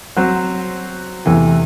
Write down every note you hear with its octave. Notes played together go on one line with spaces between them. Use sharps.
F#3 C4 F#4 C5
E2 C3 E3 A3